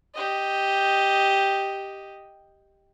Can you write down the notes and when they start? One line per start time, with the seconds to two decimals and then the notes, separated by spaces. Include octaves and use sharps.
0.14 G4 D#5